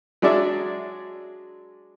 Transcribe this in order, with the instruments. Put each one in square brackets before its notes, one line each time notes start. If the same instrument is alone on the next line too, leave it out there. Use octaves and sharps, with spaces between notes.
[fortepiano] F#3 G#3 D4 D5 E5